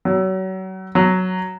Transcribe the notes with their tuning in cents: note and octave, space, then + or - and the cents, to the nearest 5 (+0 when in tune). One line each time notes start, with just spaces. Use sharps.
F#3 +30
F#3 +0